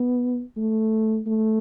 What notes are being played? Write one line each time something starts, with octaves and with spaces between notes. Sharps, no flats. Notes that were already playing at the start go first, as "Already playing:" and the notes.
Already playing: B3
A3
A3